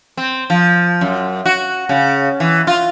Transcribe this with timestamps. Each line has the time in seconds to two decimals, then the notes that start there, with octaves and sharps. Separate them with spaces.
0.17 C4
0.50 F3
1.01 F#2
1.45 F#4
1.89 C#3
2.40 E3
2.67 F4